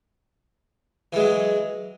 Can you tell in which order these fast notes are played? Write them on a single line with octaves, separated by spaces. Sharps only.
E3 G#3 F#3